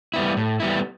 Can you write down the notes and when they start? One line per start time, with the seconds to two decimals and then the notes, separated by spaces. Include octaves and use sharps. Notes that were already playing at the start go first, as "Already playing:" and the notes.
0.14 G3 B3 E4
0.37 A2
0.60 G3 B3 E4